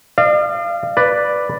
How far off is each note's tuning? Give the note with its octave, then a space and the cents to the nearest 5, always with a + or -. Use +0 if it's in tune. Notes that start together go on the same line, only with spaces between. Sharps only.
D5 +45 F5 -25
B4 +0 D5 +5